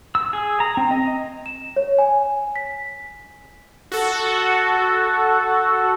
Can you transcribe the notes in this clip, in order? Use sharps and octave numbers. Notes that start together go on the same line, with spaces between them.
E6
G#4
A#5
C4
D#5
E7
C#5
G#5
B6
F#4 A4